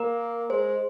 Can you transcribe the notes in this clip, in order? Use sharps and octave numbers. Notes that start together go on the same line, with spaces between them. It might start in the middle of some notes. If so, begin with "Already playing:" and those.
Already playing: A#3 A#4
G#3 C5